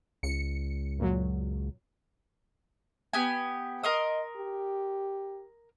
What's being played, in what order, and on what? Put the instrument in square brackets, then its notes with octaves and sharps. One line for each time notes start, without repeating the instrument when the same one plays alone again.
[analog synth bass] C#2 [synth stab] C#7
[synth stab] F#2 A#2 F#3
[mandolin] B3 G4 G#5
[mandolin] A#4 C6 D#6 [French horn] D#5
[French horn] G4